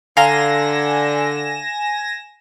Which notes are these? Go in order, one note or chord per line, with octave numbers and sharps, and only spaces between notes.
D3 F5 G#5 A#5 C6 A#6 E7